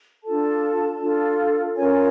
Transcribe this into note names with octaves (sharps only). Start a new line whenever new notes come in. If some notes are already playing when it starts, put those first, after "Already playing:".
D4 F4 A4 A5
D4 F4 A4
C#4 F4 A#4 C#5 G#5
G#5